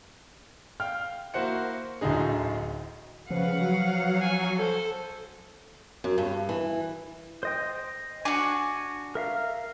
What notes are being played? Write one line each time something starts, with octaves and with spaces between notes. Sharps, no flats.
F5 G5 F6
A#3 E4 F#4 C5 F#5 C#7
D1 D2 A2 D3 D#4 G#4
C#3 F3 B4 F5 F#5
F#3
G#5
A4 C5
F#2
G2
E3
C5 D#5 G5
D4 F#4 G#5 C#6
A#4 E5 F5